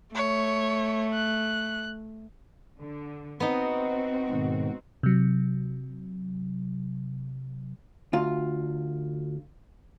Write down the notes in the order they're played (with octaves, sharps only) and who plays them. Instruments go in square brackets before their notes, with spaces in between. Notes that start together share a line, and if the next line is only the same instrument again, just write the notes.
[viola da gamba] A3 [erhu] C#5
[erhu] F#6
[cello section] D3
[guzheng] B3 D#4 [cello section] C4 F#4
[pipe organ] G#2 B2 D#3
[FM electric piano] C3 F#3
[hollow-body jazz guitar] D2 F4